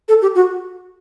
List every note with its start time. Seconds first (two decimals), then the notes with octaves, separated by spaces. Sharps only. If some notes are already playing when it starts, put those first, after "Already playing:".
0.08 A4
0.22 G4
0.35 F#4